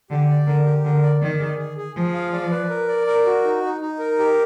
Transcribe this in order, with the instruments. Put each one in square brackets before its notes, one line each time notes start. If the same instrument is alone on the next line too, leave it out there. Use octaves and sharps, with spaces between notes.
[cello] D3 [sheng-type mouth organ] G4
[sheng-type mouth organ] D5
[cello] D3 [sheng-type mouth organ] A#4
[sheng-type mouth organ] G4
[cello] D3 [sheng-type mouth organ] A#4
[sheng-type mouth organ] D5
[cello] D#3 [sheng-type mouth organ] D5
[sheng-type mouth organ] G#4
G#4
G#4
[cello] F3 [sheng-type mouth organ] G#4
[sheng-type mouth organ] F5
D5
B4
A#4
D5
A#4
F#4
D#4
D#4
D#4
A#4
G4